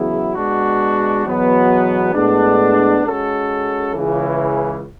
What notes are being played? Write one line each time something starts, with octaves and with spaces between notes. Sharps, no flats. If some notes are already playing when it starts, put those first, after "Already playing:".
Already playing: E2 C#3 F#3 B3 E4
B2 G#3 D4 F#4
E2 B2 F#3 B3 F#4
A2 G#3 B3 D4
G#3 C#4 F#4 A4
C#2 C#3 E3